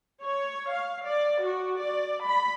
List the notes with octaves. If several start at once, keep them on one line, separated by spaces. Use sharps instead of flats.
C#5
F5
D5
F#4
D5
B5